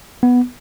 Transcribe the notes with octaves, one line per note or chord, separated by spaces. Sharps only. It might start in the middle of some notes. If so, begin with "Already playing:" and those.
B3